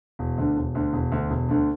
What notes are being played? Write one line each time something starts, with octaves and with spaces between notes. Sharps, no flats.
E1
D2 D3
E1
D2 D3
E1
D2 D3
E1
D2 D3